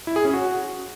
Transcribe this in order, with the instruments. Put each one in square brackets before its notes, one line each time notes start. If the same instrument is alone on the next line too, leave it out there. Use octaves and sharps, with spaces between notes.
[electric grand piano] E4
G#4
C#4
F#4